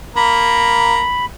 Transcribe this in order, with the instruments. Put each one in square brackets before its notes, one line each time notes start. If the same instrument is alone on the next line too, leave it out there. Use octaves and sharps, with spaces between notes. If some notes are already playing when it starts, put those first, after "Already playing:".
[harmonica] A#3 A#5 [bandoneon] B5